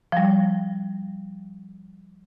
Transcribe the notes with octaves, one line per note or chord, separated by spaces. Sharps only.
F3 G3